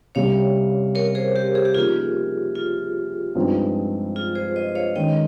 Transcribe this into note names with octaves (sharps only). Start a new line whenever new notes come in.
C3 G3 C#4 C#5 F5
A#4 C#5
G#4 C5
G4 A#4
G#4
G4
C#3 F3 A#3 D#4 F4 G#4 A#4
F4
G2 F3 G#3 C4 D#4
F4 G#4
G#4 C5
C5 D#5
C#5 F5
D#3 G#3 C#4 D#5 G5